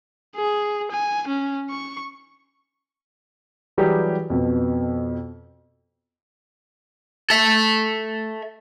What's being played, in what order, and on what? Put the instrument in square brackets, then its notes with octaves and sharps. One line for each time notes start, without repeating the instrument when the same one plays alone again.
[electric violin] G#4
G#5
C#4
C#6
[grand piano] E3 F#3 G3 G4 G#4
F2 B2
[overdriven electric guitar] A4 E5